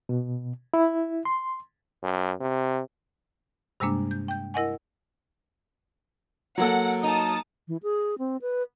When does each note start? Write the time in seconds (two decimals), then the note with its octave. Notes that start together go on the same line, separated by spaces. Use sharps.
0.09 B2
0.74 E4
1.25 C6
2.03 F#2
2.41 C3
3.80 G2 C3 G3 G#3 A#3 D4
4.11 G6
4.28 G5 G6
4.54 E4 A#4 D#5 F#5 G#5
6.58 F#3 A#3 A4 F#5
7.03 D#4 A5 D#6
7.68 E3
7.83 G#4
8.19 C4
8.42 B4